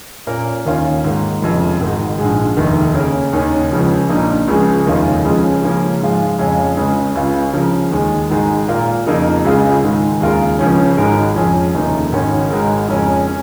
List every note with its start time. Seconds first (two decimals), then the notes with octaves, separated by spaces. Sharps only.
0.27 A#2 A#3 C#4 A#4
0.65 D#2 D#3 C#4 F4
1.04 G#2 D#3 A#3
1.41 F1 F2 C#3
1.80 G#1 G#2 D#3
2.18 A#1 G#2 F3 G#3
2.57 F1 D#2 D#3
2.95 C#3 A#3 C#4 A#4
3.33 D#2 D#3 C#4
3.71 C#2 C#3 F3
4.09 A#1 A#2 A#3 D#4
4.47 C#2 C#3 F3 G#3
4.86 F1 D#2 D#3 C#4 F4
5.24 C#2 C#3 F3 G#3 C#4
5.62 C#3 F3 A#3 C#4 A#4
6.00 G#2 F3 G#3 F4
6.39 F2 C#3 G#3 C#4 F4
6.77 C#2 C#3 G#3
7.15 C#2 C#3 G#3 F4
7.53 C#3 F3 C#4 A#4
7.91 D#2 D#3 G#3
8.30 G#1 G#2 D#3 G#3 D#4
8.68 A#2 A#3 F4 A#4
9.06 F2 C#3 A#3 D#4 A#4
9.44 C#2 C#3 G#3 F4 G#4
9.83 G#2 D#3 G#3
10.20 D#2 C#3 G#3 F4 A#4
10.59 C#2 C#3 F3 C#4
10.97 G#1 G#2 G#3 D#4 A#4
11.35 F2 F3 C#4 G#4
11.74 F1 D#2 C#3 A#3 D#4
12.12 G#1 G#2 D#3 C#4
12.51 G#1 G#2 G#3 D#4 A#4
12.88 F2 C#3 G#3 C#4 A#4
13.27 C#4